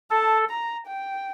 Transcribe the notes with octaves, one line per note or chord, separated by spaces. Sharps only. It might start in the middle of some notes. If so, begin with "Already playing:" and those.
A4 A5
A#5
G5